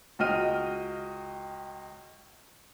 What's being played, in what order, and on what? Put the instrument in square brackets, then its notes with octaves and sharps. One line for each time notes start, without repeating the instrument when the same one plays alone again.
[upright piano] C#2 F#4 D#5 G5 F6 D#7